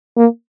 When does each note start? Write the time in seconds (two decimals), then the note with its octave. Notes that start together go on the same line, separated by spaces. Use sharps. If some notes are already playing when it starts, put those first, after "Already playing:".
0.17 A#3